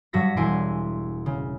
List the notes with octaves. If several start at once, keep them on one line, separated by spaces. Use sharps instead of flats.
G2 F#3 F#4 A#6 B6
E1 G2 E4 G#5 C6 D7
C#3